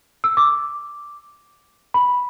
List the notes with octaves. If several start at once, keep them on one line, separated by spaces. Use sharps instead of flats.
E6
D6
B5